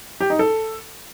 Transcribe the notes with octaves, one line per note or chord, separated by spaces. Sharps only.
G4
D#4
A4